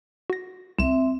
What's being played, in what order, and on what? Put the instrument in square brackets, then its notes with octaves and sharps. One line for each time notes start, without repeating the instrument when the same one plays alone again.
[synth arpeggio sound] F#4 A#6
[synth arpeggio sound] C2 [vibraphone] C4 E5